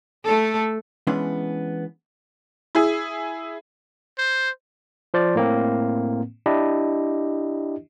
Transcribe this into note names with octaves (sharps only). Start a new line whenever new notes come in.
A3 A4
E3 G#3 B3 C#4 D4
E4 G#4
C5
F3 C5 D5
A2 A#3 C4
D4 E4 G4 D#5